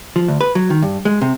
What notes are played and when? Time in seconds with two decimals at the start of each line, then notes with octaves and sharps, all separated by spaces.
0.16 F3
0.28 D2
0.41 B4
0.55 F#3
0.70 D#3
0.82 G2
1.05 G#3
1.21 C3